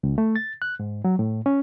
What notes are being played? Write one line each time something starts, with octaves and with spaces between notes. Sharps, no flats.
C#2
A3
A6
F#6
G#2
F#3
A2
C#4